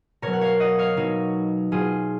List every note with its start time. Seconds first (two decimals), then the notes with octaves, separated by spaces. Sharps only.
0.22 B2 F#3 A#4 C#5
0.33 F#5
0.41 C#5 F5
0.60 D#5 F#5
0.79 C#5 F5
0.97 B2 F#3 D#4 F#4
1.72 B2 F#3 F4 G#4